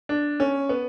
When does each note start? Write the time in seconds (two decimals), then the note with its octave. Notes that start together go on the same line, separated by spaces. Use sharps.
0.09 D4
0.40 C#4
0.69 B3